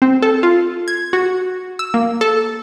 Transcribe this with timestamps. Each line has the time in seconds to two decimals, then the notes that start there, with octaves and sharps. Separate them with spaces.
0.02 C4
0.22 A4
0.43 F4
0.88 G#6
1.13 F#4
1.79 E6
1.94 A#3
2.21 A4